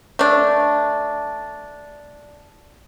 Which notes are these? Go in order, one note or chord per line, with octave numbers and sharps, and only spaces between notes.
A3 D4